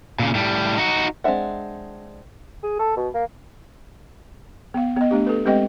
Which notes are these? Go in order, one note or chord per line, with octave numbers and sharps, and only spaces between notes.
A#2 C#3
A2 G3
D#4 F#4
G#3 C4 D4 E5 F#5
G#4
A4
B2
A#3
B3 F5
B3 D#5
A3 D4 G4
A4 B4
G#3 C4 G4 B4 D#5 G5